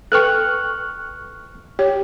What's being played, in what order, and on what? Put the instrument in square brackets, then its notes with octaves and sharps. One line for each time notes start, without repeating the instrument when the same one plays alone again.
[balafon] A4 B4 G5 [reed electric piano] C#6 F6 F#6
[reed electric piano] G4 [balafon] C#5